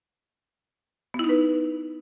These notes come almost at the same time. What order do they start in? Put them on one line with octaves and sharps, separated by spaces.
B3 E4 D#4 B4